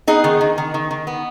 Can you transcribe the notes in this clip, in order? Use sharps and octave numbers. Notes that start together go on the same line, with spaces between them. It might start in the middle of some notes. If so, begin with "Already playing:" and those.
B3 D#4 G#4
D#3
D#3
D#3
D#3
D#3
B3